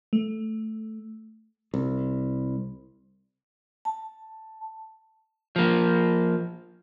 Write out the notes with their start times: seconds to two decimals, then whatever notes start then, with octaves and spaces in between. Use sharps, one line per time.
0.13 A3
1.74 C2
3.85 A5
5.56 F3 A#3